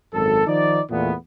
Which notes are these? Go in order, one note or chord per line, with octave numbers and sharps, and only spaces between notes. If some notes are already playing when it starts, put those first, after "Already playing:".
G#1 F#2 A4
D#3 F3 D#4 D5
E2 A#2 A3 B3